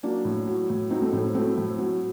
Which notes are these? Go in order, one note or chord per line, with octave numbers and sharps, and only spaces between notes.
F#3 A#3 D4
A2
F#3
A2
F#3 C4 D#4
A3 C4
A2 A3 C4
F#3 A3 C4
A2
F#3